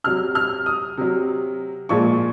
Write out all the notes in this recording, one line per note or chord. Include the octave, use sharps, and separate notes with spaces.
C3 F#3 F6
F6
D#6
C3 F#3
A#2 F3 G#3 C#6